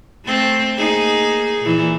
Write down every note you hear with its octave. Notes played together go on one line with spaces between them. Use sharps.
A3 C4
A#3 D#4 G#4
A#2 E3